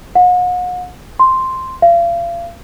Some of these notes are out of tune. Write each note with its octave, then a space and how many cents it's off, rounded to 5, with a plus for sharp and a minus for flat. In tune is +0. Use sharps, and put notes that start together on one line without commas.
F#5 -40
C6 +0
F5 -35